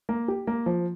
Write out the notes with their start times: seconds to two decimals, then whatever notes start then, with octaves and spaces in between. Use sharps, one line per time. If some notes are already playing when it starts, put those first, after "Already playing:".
0.09 A#3
0.28 G4
0.47 A#3
0.66 F3